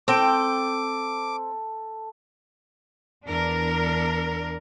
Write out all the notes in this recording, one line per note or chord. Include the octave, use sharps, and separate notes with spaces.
C4 A4 G5 D6
E2 D4 A#4